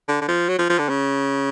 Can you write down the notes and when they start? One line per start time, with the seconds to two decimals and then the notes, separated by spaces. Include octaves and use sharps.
0.09 D3
0.21 D3
0.28 F3
0.49 F#3
0.59 F3
0.69 F3
0.79 D3
0.89 C#3